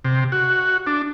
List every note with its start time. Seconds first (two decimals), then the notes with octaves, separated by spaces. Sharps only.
0.04 C3
0.32 F#4
0.87 D4